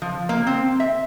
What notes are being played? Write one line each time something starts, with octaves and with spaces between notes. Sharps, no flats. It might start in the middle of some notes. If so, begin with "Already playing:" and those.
F3
A#3
C4
E5